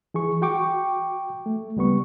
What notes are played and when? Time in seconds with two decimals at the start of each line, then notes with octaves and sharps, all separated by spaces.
0.14 E3 G#4 C#6
0.42 F#4 G5 C#6 D6
1.46 A3
1.76 C#2 G3 B3 C#6